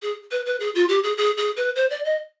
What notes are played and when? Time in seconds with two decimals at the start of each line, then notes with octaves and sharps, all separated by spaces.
0.02 G#4
0.31 B4
0.46 B4
0.60 G#4
0.75 F4
0.89 G4
1.04 G#4
1.18 G#4
1.37 G#4
1.57 B4
1.76 C5
1.90 D5
2.05 D#5